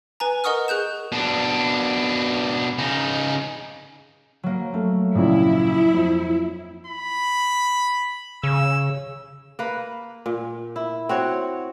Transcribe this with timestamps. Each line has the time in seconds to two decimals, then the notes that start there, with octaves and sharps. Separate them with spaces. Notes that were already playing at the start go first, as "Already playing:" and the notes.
0.20 B4 G#5 A#5
0.44 A#4 D#5 F#5 C#6 D#6 F6
0.68 G#4 F#6 G6 E7
1.12 B2 D4
2.79 C#3 D#4
4.43 F#3 A#3
4.74 A3
5.15 A#1 C#3 E4
5.94 F2
6.87 B5
8.44 C#3 E6
9.59 A#3 B4
10.26 A#2
10.76 E4
11.09 C4 F#4 C#5